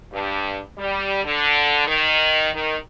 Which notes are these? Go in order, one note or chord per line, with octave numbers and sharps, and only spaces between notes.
G2
G3
D3
D#3
D#3